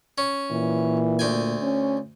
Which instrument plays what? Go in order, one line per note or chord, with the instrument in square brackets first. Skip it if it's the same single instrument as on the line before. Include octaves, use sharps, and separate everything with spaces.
[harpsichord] C#4
[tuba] A#2 [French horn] E3
[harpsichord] D2 G5 G#5
[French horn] C#4